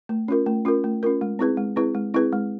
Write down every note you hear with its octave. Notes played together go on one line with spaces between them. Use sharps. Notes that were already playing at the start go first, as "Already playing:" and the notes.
A3
C#4 F4 A#4
A3
C#4 F4 A#4
A3
C#4 F4 A#4
G#3
C4 E4 G#4 B4
G#3
C4 E4 G#4 B4
G#3
C4 E4 G#4 B4
G#3